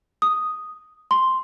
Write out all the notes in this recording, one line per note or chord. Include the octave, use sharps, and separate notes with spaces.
D#6
C6